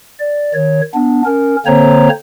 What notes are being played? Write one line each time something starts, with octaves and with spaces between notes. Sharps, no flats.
D5
D#3 C#5
B3 D4
C#4 A#4
D3 A#3 C4 C5 C#5 A#5